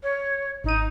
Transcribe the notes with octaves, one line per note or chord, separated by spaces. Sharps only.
C#5
G#1 D#4 D#7